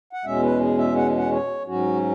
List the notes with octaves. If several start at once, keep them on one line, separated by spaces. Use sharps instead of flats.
F#5
E2 B2 G#3 C#4 E5
B4
G#4
E5
F#5
F#5
C#5
G#2 F#3 C#4 F#4